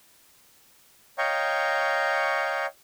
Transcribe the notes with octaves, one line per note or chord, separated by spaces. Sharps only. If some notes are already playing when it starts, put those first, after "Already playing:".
C#5 D#5 F5 G5 A#5 C#6